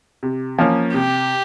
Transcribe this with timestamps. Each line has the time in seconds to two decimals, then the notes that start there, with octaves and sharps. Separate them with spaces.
0.23 C3
0.58 F3 A#3 C#4
0.94 C3 G4